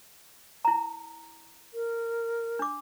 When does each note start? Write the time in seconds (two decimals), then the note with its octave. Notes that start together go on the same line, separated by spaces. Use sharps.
0.65 E4 A#5
1.74 A#4
2.59 D4 D6